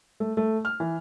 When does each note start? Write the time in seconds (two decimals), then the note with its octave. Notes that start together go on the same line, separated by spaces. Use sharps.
0.20 A3
0.37 A3
0.65 F6
0.80 E3